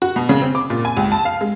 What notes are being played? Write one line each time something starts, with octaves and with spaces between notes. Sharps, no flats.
F#4
B2
C#3
C4
D6
A#2
G#5
C#2
A5
F5
G#3